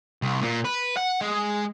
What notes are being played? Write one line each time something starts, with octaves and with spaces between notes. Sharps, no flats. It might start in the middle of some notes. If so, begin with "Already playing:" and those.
C2
A#2
B4
F#5
G#3